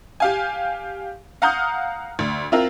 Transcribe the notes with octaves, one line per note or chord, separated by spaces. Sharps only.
G4 F5 G#5
F5 F#5 A#5 D#6 F6 G6
D2
C4 E4 F4 A#4